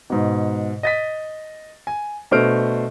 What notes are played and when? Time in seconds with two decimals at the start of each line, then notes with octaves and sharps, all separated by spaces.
0.10 G#2 B2
0.83 D#5 A6 B6
1.87 G#5
2.31 B2 A3 D4 C5 F6 D7